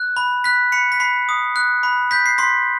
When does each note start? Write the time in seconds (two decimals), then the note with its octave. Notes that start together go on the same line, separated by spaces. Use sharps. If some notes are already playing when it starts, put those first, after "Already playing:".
Already playing: F#6
0.17 B5
0.44 F#6 B6
0.72 B5 C#7
0.92 B6
1.00 B5 C7
1.29 D#6
1.56 F#6
1.83 B5
2.11 G6 B6
2.26 C7
2.38 C6 B6